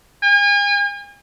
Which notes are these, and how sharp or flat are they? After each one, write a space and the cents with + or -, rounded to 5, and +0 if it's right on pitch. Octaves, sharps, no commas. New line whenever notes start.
G#5 -40